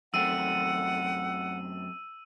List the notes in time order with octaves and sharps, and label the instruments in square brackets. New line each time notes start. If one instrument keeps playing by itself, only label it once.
[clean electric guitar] F#2 A3 C4 [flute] F#5 [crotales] E6 D#7